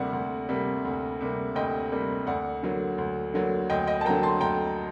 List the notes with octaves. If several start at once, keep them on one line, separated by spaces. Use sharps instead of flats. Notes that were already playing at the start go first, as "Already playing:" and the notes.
Already playing: D2 C3 G3 A#3 D5 F#5
D2
C3 G3 A#3
D2
C3 G3 A#3
D2 D#5 G5
C3 G3 A#3
D2 D5 F#5
D3 F#3 A#3
D2
D3 F#3 A#3
D2 D#5 G5
D#5 G5
A5
D3 F#3 A#3 G5 A#5
A5 C6
D2 G5 A#5